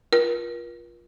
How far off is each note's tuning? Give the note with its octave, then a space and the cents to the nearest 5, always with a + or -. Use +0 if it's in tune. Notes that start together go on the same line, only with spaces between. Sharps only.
F4 +0 A#4 +45